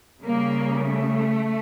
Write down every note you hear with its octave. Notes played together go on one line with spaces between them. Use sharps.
C#3 G3 A#3
A3